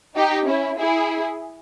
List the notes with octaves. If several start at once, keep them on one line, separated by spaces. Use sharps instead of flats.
D#4 G4
C#4 E4
E4 G#4